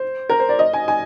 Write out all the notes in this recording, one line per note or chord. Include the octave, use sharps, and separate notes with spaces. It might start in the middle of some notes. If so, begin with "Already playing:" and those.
Already playing: C5
A#4
C5
D5
D#5
G#5
G#5